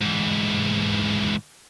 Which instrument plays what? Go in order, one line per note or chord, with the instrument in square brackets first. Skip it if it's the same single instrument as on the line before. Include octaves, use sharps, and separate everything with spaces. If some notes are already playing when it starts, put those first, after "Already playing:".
[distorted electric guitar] G#2 E3